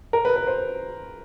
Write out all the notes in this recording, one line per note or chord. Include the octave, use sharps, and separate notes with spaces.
A#4
B4
B4
C5